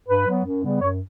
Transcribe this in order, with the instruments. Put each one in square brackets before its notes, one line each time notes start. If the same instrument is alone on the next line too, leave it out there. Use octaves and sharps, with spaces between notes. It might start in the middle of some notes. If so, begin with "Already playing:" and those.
[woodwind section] G2 B4
F#3 B3
F#2
C#3 G3 B3
F#2 C#5